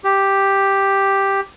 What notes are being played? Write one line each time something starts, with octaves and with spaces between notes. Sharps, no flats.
G4